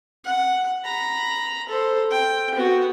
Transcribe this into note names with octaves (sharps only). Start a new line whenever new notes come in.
F#5
A#5 B5
A4 C5
G5
B3 F#4